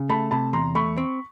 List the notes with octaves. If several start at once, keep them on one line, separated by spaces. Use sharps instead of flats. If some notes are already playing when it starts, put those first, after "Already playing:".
Already playing: C#3
A3 A5 B5
C3 A5 B5
E2 A#5 C6
A3 B5 C#6
C4